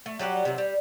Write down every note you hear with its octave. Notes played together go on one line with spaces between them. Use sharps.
A3
F#3 G3 G4 F#5
C3 D#3 F#3
G3